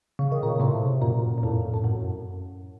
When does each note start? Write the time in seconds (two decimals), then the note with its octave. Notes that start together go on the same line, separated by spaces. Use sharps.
0.19 C#3
0.32 D#3
0.43 A#2 C#3
0.56 A#2
0.60 A2 C3
1.01 F#2 A#2
1.38 A#2
1.43 F2 A2
1.74 A2
1.84 F#2